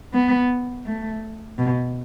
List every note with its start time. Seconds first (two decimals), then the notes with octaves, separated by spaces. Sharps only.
0.14 B3
0.85 A3
1.58 B2